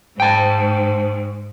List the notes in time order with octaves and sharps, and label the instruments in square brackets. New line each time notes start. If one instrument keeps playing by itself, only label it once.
[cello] G#2 [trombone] C5 [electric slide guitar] G5 A5